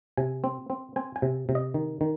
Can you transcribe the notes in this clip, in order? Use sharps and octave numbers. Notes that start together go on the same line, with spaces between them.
C3 G#5
C4
C4
C4 G#5
G#5
C3
C3
D#5
D#3
D#3